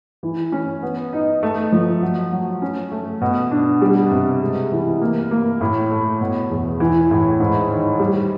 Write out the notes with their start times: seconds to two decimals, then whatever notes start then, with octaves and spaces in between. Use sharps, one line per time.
0.23 E3
0.52 C#4
0.83 B3
1.13 D#4
1.43 A3
1.72 F3
2.02 F#3
2.32 F#3
2.62 C#4
2.92 A3
3.21 B2
3.51 D4
3.82 G3
4.11 C3
4.41 G#3
4.72 E3
5.01 A#3
5.31 A#3
5.61 A2
5.91 A3
6.21 B2
6.50 E2
6.80 E3
7.11 A2
7.40 G#2
7.70 D#3
8.00 G3